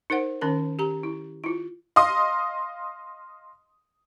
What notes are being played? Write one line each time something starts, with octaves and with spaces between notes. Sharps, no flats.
D#4 A#4 C5 F#5
D#3 C#4 A#4 A5
G4 A#5
E4
E4 F4
D#5 F5 C6 D#6